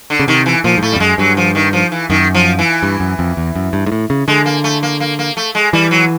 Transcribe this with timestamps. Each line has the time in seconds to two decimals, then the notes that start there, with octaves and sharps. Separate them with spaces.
0.10 D3
0.20 C#3
0.28 C3 D#3
0.46 E3
0.64 A#2 F3
0.78 G#2
0.82 A2 A3
0.92 G3
0.95 F2
1.00 F#2 G#3
1.18 G2 F#3
1.37 F3
1.55 D#3
1.73 F3
1.92 E3
2.10 F#2 D#3
2.34 F3
2.59 E3
2.83 G2
3.00 F#2
3.19 F2
3.37 E2
3.56 F#2
3.73 G2
3.86 G#2
3.92 A2
4.10 C#3
4.28 D3 G#3
4.46 A#3
4.64 A3
4.83 A#3
5.00 A#3
5.19 A#3
5.37 A3
5.55 G#3
5.73 E3 G3
5.91 F#3